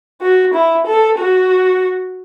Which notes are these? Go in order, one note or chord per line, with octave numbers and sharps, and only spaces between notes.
F#4
E4
A4
F#4